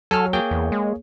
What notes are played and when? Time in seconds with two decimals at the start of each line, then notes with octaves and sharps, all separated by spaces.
0.11 F#3 A4 G#5 F6
0.33 A#3 G#4 C#5 G5
0.51 E2
0.72 G#3